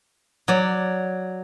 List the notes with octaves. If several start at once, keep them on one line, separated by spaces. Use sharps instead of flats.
F#3 D5